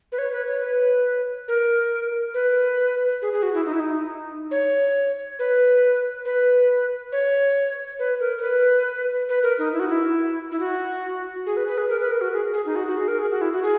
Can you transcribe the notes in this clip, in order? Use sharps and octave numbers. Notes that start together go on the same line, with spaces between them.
B4
C#5
B4
C#5
B4
A#4
B4
G#4
G#4
F#4
E4
D#4
E4
D#4
C#5
B4
B4
C#5
B4
A#4
A#4
B4
B4
A#4
D#4
E4
F#4
E4
E4
F#4
G#4
B4
B4
G#4
A#4
B4
A#4
F#4
G#4
G#4
D#4
F#4
F#4
G#4
A#4
G#4
F#4
E4
F#4
G#4